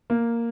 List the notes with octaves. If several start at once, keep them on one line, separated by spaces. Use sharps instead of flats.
A#3